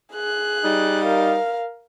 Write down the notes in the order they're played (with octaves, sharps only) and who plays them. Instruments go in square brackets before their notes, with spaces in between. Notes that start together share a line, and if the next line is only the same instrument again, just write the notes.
[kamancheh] G#4 F#6
[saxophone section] G3 D#4
[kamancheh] A#4 F5